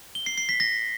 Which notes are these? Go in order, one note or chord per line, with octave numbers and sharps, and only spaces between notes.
G7
C7
C7
B6
A#6